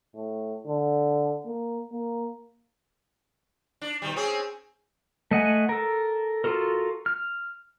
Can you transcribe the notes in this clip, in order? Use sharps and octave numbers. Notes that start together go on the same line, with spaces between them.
A2
D3
A#3
A#3
D4
B2 D#3 G3
C4 C#4 G#4
A3 D#5 F#5 G#5
A4 A#4
F4 F#4 A4 A#4
F6